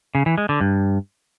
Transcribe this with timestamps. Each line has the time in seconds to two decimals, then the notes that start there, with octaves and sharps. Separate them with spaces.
0.15 C#3
0.26 E3
0.38 G#3
0.49 D3
0.61 G2